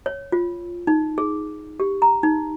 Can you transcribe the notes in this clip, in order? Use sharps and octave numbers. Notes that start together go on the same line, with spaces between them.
C#5
F4
D#4
G#4
G4
A#5
D#4